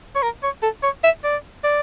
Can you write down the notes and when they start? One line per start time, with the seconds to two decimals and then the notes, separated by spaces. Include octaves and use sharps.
0.15 C#5
0.22 A#4
0.43 C#5
0.62 A4
0.83 C#5
1.04 E5
1.23 D5
1.64 D5